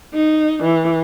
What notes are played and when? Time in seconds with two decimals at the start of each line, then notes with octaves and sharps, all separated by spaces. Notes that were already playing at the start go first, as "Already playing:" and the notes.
0.14 D#4
0.63 E3